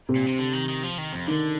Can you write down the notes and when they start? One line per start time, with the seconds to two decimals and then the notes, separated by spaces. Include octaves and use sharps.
0.09 C3
0.15 A#2
0.27 C3
0.38 D3
0.53 D#3
0.69 D#3
0.83 F3
0.98 D#3
1.13 F2
1.28 D3 D#3